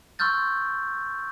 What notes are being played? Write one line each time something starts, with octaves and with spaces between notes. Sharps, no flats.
C6 C#6 E6 F6 G6 A6